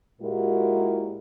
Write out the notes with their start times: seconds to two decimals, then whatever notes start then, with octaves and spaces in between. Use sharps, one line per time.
0.22 A#2 G#3 E4 F#4 G4 A#4